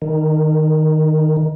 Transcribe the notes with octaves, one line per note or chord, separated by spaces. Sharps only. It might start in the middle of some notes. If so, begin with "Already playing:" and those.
D#3